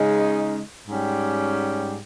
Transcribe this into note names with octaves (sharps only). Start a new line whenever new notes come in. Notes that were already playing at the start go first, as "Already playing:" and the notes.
Already playing: C#3 G#3 D#4
G#2 G3 C#4 G4